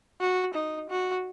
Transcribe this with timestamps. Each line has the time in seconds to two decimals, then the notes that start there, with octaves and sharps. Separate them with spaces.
0.20 F#4
0.54 D#4
0.89 F#4